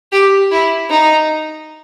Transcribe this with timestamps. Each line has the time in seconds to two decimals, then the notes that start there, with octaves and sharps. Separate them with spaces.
0.12 G4
0.51 E4
0.90 D#4